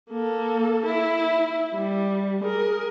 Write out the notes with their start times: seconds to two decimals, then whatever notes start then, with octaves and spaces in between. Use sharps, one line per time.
0.11 A#3 A4
0.86 E4
1.75 G3
2.41 G#4 A#4